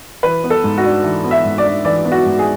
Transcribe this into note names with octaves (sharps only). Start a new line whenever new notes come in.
E3 B4
B3
A4
G#2
F#4
D4
E3
B3
E5
G#2
D5
D4
E3 D5
B3
F#4
G#2
G#4